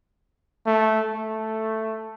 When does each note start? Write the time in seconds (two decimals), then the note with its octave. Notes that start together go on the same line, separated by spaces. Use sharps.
0.66 A3
1.14 A3